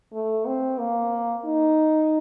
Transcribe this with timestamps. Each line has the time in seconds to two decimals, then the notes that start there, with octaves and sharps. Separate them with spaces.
0.13 A3
0.46 C4
0.78 A#3
1.45 D#4